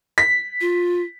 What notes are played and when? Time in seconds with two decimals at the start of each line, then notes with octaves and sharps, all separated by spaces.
0.18 B6
0.61 F4